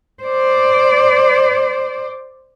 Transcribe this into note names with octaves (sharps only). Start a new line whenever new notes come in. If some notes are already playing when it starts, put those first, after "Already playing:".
C5 D5